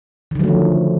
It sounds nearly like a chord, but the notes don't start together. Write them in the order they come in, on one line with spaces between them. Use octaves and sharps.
D#3 D3 F#3 A3 F3